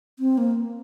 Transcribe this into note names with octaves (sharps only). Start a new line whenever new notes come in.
C4
A#3